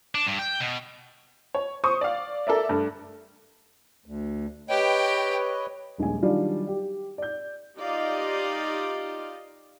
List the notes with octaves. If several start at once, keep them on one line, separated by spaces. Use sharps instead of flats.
D4
G2
G5
B2
C#5
C5 C#6 D#6
D5 F5
A4 A#4 D5 E5
G2 A3
D2
G4 B4 C#5 D#5 G5
D#1 A#1 G#3 G#5
D#3 F#3 G3 D4 F4
G4
D5 G6
D#4 F4 G4 D5 D#5 F5